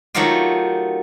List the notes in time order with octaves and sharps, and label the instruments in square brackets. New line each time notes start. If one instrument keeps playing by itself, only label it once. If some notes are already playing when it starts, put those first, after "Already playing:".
[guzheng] D#3 F#3 A3 D#4 F4 G4